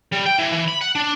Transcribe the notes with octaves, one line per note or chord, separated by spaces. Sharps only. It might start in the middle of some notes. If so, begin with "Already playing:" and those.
G3
G5
E3
E3
B5
F#5
D4